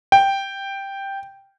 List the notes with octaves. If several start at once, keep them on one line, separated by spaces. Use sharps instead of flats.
G5